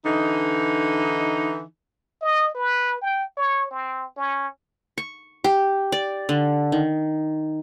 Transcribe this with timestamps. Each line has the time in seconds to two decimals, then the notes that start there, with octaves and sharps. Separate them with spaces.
0.05 D3 E3 D#4
2.22 D#5
2.55 B4
3.02 G5
3.37 C#5
3.71 C4
4.17 C#4
4.98 C#6
5.44 G4
5.92 D5
6.29 D3
6.72 D#3